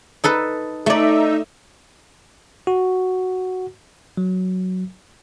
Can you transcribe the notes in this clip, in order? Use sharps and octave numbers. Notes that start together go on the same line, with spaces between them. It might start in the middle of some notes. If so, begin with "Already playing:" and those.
D#4 A4 B4
A3 D#4 D5 E5
F#4
F#3